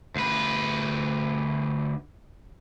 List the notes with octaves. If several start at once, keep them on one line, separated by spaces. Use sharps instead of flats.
D2 B4